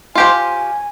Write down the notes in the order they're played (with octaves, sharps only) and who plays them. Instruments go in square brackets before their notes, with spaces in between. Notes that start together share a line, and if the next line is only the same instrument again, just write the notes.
[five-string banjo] F4 G4 C5 [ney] G#5